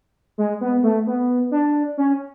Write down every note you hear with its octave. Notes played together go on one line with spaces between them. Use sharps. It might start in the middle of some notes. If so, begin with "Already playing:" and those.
G#3
B3
A3
B3
D4
C#4